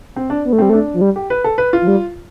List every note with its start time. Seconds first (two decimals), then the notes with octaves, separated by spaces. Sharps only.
0.16 C4
0.30 D4
0.45 B3
0.53 A3
0.59 G3 C4
0.70 A3 D4
0.94 F3
1.01 G3
1.16 G4
1.30 B4
1.44 A4
1.58 B4
1.73 F4
1.82 F3
1.87 G3